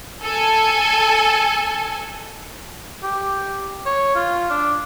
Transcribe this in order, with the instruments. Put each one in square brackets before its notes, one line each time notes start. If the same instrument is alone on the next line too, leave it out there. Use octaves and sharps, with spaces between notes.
[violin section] A4 G#5
[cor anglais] G4
C#5
F4
D4